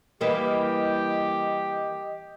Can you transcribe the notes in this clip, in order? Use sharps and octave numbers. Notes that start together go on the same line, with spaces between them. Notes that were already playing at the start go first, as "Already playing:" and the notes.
E3 G3 A#3 G4 D#5 D#6